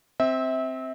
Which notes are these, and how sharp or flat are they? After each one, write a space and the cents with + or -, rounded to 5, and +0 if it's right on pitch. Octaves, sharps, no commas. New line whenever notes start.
C4 +0 E5 -25